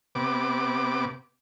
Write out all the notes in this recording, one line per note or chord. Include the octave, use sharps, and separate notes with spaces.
C3 B3 D6